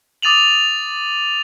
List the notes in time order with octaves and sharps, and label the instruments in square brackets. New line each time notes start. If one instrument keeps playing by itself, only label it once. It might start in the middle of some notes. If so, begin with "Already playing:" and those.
[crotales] D6 D#6 A6 D#7 F7 F#7